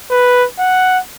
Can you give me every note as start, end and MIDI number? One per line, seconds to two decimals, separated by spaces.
0.11 0.45 71
0.59 0.99 78